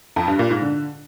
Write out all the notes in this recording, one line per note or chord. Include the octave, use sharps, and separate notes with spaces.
F2
G2
A#2
G#2
D3